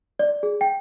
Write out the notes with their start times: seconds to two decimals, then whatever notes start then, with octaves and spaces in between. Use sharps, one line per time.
0.19 D5
0.43 G#4
0.61 G5